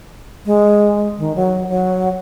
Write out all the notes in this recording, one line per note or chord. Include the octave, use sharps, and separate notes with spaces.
G#3
D#3
F#3
F#3